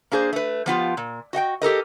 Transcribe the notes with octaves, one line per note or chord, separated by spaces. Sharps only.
A#3 D4 G#4 C5
A3 B4
F3 B3 F4 G4
A#2
F#4 D#5 F#5 G5
G4 A4 A#4 D#5